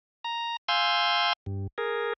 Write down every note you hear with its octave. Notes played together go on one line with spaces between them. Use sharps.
A#5
F5 G#5 C6 E6 G6
G2
G#4 A#4